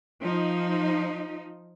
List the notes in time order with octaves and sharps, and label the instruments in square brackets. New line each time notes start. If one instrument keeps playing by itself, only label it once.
[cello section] F3 D#4